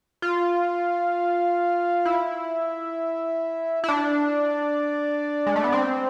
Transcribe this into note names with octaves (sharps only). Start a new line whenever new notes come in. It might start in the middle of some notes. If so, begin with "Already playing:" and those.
F4
E4
E4
D4
G#3
A3
B3
C4